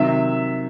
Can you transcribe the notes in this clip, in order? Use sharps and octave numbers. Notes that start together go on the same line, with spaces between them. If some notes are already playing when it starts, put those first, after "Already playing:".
Already playing: C3 D#3 F#3 E5